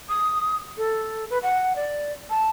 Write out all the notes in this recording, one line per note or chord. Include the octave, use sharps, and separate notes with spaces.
D#6
A4
B4
F#5
D5
A5